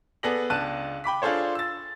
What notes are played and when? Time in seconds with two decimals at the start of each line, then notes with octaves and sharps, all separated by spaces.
0.23 B3 G#4 A4 D5 A#6 F#7
0.50 C#2 D4 A5 F#6 D#7
1.04 G5 B5 D6 B6
1.22 D4 F4 G#4 A4 C5 C#5
1.55 E6 A6